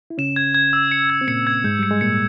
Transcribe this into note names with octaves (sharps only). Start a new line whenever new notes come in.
E4
C#3 C#4 E7
G#6
G#6
E6
C#7
G#6
C4
A#2 A#3 C#7
G#6
G#2 G#3 G6
G3 C#7
G#3
A#2 A#3 C#7